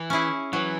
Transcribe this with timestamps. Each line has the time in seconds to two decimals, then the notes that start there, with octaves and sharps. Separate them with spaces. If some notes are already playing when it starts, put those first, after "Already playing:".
Already playing: E3
0.10 C#4 E4 G#4
0.53 E3 F#3